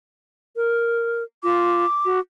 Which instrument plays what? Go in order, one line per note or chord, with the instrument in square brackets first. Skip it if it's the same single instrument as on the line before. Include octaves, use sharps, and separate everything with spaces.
[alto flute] A#4
[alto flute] F4 [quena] D6
[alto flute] F#4